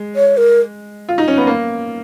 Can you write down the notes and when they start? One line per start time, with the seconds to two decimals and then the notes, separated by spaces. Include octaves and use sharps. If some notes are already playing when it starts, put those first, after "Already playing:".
Already playing: G#3
0.15 C#5
0.37 A#4
1.09 F4
1.18 D#4
1.28 C#4
1.37 B3
1.47 A#3